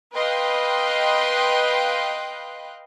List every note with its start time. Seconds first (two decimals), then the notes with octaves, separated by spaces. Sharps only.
0.15 B4 D#5 F5 G5 C6 F#6